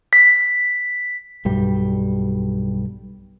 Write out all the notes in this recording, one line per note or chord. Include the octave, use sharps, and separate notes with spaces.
B6
B1 G2 G3